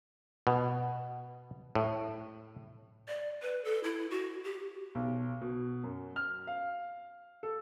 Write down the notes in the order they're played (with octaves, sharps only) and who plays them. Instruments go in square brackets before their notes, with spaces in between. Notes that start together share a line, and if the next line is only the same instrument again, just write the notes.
[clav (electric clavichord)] B2
A2
[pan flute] D5
B4
A4
E4
F#4
G4
[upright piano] B1
B2
F#2
F6
F5
A4